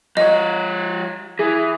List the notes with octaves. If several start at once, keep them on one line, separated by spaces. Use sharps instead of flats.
F3 C#5 D#5
E3 G#4